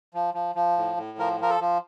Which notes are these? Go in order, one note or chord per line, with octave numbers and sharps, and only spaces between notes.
F3
F3
F3
A2
A2
F3 A#4
F3 A#4
A4
F3